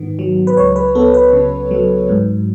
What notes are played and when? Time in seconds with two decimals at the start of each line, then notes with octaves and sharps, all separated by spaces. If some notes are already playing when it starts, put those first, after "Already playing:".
Already playing: G#2 D#3 B3
0.19 F#3
0.47 B4
0.57 C#2 C#5
0.76 B4
0.95 B3 A4
1.14 B4
1.33 C#3
1.71 F#3
2.10 G#2